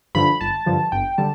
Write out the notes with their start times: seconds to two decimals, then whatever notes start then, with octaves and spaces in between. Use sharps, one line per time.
0.15 G2 D3 F3 B5
0.41 G1 A5
0.66 G2 D3 F3
0.92 G1 G5
1.18 D3 G3 A5